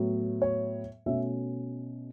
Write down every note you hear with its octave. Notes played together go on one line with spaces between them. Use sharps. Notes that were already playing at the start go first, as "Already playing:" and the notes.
Already playing: A2 F#3 B3
C#5
B2 A3 C#4 E5